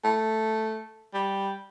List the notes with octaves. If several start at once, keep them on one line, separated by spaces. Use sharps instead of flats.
A3
G3